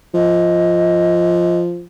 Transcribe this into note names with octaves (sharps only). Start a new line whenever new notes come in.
F3 D#5